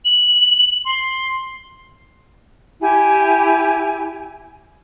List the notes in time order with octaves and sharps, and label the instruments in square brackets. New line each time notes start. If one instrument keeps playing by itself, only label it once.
[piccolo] F#7
C6
[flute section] E4 G4 G#5